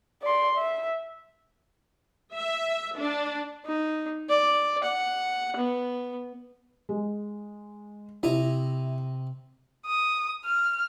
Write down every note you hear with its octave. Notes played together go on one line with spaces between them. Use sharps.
D5 C6
E5
E5
D4
D#4
D5
F#5
B3
G#3
C3 E4 D#5 A#5
D#6
F6